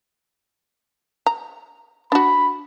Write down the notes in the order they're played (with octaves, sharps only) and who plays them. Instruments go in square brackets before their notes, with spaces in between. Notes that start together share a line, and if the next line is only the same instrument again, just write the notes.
[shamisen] A#5
[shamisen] D4 F#4 [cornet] B5